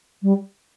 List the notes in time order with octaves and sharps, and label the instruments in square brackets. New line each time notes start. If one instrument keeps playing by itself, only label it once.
[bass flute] G3